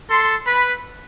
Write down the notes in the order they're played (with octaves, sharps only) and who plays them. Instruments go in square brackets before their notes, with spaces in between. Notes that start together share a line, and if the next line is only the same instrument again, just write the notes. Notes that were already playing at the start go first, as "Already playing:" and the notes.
[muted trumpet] A4 [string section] C6
[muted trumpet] B4 [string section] B5